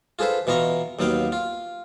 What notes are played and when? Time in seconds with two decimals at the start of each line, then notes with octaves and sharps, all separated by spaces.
0.19 F4 G#4 A4 B4 C5
0.47 B2 E3 F4 D#5 A#5 C#6
0.99 D#2 F#3 B3 F5 G5
1.32 F4